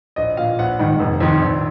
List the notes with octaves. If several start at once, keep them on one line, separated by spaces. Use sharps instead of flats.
A#1 D#5
A#2 F5
A#1 F#5
G#2 D#3
F1
F2 D#3
A#1